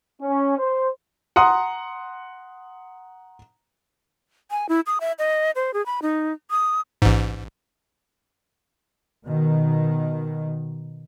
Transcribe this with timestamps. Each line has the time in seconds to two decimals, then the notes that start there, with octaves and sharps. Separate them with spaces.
0.21 C#4
0.58 C5
1.36 F#5 A#5 C6 D#6
4.51 G#5
4.69 E4
4.87 D#6
5.01 E5
5.19 D#5
5.56 C5
5.74 G#4
5.86 B5
6.02 D#4
6.51 D#6
7.02 A1 G#2
9.25 B2 D#3